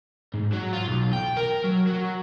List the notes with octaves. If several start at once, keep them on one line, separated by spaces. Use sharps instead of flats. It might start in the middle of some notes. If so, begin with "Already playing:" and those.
G#2
F#3
F4
B1
G5
A#4
F#3
F#3